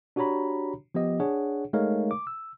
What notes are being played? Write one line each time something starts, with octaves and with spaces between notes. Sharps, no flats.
D4 F#4 G4 C#5 A#5 B5
F3 B3 G4 D#5
D4 G#4 C#5 F#5
G#3 A3 D#4 A#4 C#5 F5
D6
E6